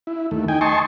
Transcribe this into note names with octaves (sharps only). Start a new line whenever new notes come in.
E4
D#2 A3
D#4 G5 G#5
D#5 G#5 A5 C6 C#6